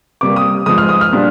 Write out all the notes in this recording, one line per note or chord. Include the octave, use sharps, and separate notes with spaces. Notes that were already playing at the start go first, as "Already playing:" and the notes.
C3 G3 A#3 D6
D#6
G#2 F3 G#3 D#6
F6
D#6
F6
A#2 G3 D4